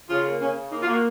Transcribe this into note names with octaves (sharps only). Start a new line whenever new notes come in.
C#3 F4
A#3
C#3 C#4
C#3
A#3 D#4
F4
A#3
F#4